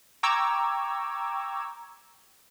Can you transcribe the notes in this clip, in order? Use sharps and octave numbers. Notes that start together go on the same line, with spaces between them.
G5 A#5 C#6 D6 E6 G#6